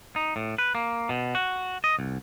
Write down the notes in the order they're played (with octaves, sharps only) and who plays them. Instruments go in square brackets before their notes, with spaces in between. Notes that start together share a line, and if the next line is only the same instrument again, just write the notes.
[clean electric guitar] D#4
A2
B4
A#3
B2
F#4
D#5
C2